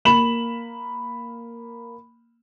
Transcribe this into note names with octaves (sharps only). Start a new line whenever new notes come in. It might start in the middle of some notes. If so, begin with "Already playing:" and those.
A#3 B5 E7 F#7